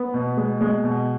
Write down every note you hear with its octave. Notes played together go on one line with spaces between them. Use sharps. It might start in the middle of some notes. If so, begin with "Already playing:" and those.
Already playing: B3
B2
G#3
G#3
B2